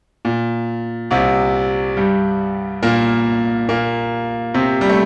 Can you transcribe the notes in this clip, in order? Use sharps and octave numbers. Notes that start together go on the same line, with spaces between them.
A#2
C2 C3
G2 G3
A#2 A#3
A#2 A#3
C3 C4
G3
A3